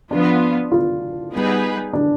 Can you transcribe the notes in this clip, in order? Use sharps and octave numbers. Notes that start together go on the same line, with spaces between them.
F3 B3 D4 F4
F4
G3 B3 D#4 G#4 B4
D4